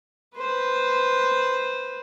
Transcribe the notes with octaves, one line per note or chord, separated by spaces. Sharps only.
B4 C5